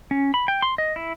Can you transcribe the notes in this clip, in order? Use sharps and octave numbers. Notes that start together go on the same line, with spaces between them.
C#4
B5
G5
C6
D#5
E4